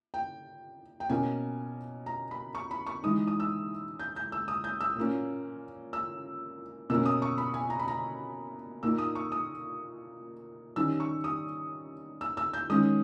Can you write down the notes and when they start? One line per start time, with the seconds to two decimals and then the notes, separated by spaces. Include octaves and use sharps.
0.14 G5
1.00 G5
1.10 B2 A#3 C#4 G#5
2.06 A#5
2.31 B5
2.55 C#6
2.71 B5
2.87 C#6
3.03 E3 G#3 D#4 D#6
3.27 D#6
3.40 E6
3.99 G6
4.16 G6
4.32 E6
4.48 D#6
4.64 G6
4.81 E6
4.96 A#2 A#3 C#4
5.93 E6
6.90 B2 A#3 C#4 E6
7.06 D#6
7.22 C#6
7.38 B5
7.54 G#5
7.70 A#5
7.79 B5
7.88 A#5
8.83 A#2 A#3 D#4 E6
8.98 D#6
9.15 C#6
9.32 D#6
10.76 D#3 G3 C#4 E6
11.00 C#6
11.24 D#6
12.21 E6
12.37 E6
12.53 G6
12.69 D#3 G#3 C#4 D#6